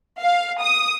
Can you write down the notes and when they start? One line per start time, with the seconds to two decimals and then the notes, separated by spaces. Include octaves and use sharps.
0.22 F5
0.62 D#6